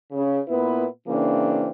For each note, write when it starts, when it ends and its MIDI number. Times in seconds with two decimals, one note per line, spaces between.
0.12 0.39 49
0.47 0.86 46
0.47 0.86 59
0.47 0.86 64
0.47 0.86 71
1.08 1.69 49
1.08 1.69 52
1.08 1.69 58
1.08 1.69 60
1.08 1.69 62